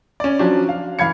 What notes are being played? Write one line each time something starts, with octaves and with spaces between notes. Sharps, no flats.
C#4 D5
F3 F#3 C#4 D4
F5
E3 F5 B5 G#6 C#7